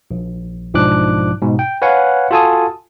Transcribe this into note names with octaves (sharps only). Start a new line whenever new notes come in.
A#1
B1 G#2 F3 D4 D6 F#6
G#2 B2
G5
B4 C#5 F5 F#5 G#5
F4 F#4 A4 G#5 A5 D#6